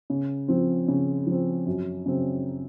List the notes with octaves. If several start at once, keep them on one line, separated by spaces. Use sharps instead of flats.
C#3
F3 C4
C#3
F3
C4
F#2
C#3 F#3 C4